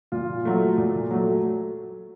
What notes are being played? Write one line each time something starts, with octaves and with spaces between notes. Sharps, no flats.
A#2 F4
F#3 A3
A#2
F#3 A3